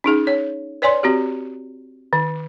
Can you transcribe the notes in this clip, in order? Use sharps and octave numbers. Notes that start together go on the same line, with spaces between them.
C#4 D#4 G#4
C#5
B4 C#5 D5 G#5 C6
C4 F#4 G4
D#3